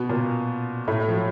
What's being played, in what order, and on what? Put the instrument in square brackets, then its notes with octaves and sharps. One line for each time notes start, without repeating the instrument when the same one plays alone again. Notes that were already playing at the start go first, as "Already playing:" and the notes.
Already playing: [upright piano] B2 B3
A#2 A#3
A2 A3
F3
F#3